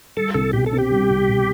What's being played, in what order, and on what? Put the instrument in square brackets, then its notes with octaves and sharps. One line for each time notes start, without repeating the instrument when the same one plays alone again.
[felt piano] G3 [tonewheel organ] A4
[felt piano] C2 [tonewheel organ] A4
[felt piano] B2 [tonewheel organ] G4
[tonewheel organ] A4
[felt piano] C4
[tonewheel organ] G4
[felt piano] G3
C2
B2